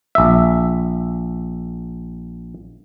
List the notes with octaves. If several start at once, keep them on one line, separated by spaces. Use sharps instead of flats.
A#1 E5